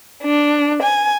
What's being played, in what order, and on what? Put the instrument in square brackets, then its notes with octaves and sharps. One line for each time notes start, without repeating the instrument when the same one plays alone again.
[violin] D4
G#5